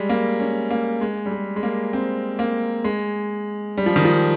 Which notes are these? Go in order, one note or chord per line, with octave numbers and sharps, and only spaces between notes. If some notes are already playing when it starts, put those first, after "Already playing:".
Already playing: G3 G#3
A#3
C#4
A#3
G#3
G3
G#3
G#3
A#3
C4
A#3
G#3
G3
F3
D#3
F3